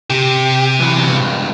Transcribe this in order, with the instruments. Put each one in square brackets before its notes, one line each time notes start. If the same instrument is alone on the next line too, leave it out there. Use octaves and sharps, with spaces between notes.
[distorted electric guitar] C3 [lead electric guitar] G4
[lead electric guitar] E3 F#3
C#2 G2